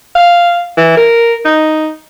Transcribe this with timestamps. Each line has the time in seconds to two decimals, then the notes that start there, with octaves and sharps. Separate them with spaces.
0.15 F5
0.77 E3
0.97 A#4
1.45 D#4